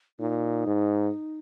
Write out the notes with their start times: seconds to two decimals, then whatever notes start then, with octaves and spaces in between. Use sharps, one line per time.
0.19 A#2 D#4
0.67 G#2